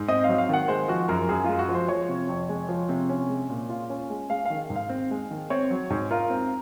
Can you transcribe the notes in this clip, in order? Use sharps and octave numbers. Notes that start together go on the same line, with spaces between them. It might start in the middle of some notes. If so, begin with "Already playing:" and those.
Already playing: G#2
C4 D#5
F#3 F5
F5
D#3 F#5
G#3 C5
F3 F#4
F#2 A#4
F#2 G#4
G#3 F4
F#4
F3
C5
F3 C#5
C3
F2
G#3
F3
C3
C#4
G#3
A#2
F4
C#4
G#3
G#3 F5
D#3 F5
G#2
F5
C4
G#3
D#3
C4 C#5
F#3
G#2
F4 A#4
C4